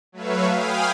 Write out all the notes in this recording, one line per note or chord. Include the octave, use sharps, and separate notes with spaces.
F#3 A3 B4 C#5 E5 F5
F5 G5 G#5 B5 D#6 F6